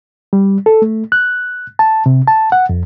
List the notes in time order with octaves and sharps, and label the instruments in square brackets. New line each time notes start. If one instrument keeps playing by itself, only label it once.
[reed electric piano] G3
A4
A3
F#6
A5
C3
A5
F#5
F2